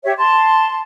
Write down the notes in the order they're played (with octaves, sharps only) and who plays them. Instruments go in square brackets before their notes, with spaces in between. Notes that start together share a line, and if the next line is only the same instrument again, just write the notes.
[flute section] G4 C#5 E5
A5 C6